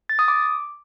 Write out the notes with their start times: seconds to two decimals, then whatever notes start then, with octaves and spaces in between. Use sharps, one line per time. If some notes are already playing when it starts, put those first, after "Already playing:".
0.09 A6
0.19 D#6
0.28 D6